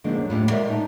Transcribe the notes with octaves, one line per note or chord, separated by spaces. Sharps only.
D3 D#3 F3 G#3 A#3 D4
F#2
D#2 A2 G3 F4
G#3 A#4 D5 E5
D#4 A5